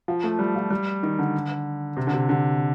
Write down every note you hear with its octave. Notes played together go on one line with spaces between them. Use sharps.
F3
A3
G3
F3
G3
D#3
D3
C3
D3
C3
D3